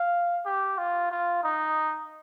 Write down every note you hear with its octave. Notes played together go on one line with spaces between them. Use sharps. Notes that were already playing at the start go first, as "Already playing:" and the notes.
Already playing: F5
G4
F4
F4
D#4